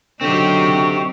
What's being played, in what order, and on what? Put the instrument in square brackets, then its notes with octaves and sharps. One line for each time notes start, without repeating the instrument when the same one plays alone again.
[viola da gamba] F#2 F#3 D#4 [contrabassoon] D3 [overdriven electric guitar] C4 G4 [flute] C#6